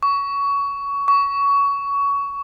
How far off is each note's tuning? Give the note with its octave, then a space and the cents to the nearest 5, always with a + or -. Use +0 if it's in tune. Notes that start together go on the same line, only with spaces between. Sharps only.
C#6 +20
C#6 +20